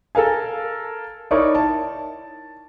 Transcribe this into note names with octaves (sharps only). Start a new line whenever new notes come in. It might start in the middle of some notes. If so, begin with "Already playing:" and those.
A4 A#4 F5 G#5
D#4 E4 A#4 C#5 D5 C#6
A5